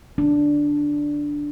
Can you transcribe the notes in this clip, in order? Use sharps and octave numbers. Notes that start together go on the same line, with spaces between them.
D4